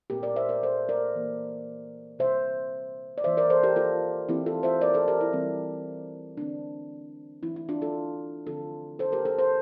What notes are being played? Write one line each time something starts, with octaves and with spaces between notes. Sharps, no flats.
A#2 A3 C4 G4 A#4
A#4 D5
C5 E5
A#4 D5
A4 C5
A#4 D5
E3 A#3
C3 G3 C4 C5 E5
D5
E3 A#3 C5 E5
A#4 D5
A4 C5
G4 A#4
F4 A4
E3 A3 C4 E4 G4
F4 A4
C5 E5
A#4 D5
A4 C5
G4 A#4
E4
E3 G3 C4
D3 A3 C4 D4
E3 A3 C4 E4
E4
D4 F4
F4 A4
D3 F3 A3 C4 F4 A4
A4 C5
G4 A#4
A4 C5
A4 C5